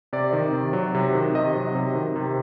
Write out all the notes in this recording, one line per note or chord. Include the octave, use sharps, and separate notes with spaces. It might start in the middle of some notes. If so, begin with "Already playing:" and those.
C3 D5
D#3
C3
F#3
C3
D#3
C3 D#5
F#3
C3
D#3
C3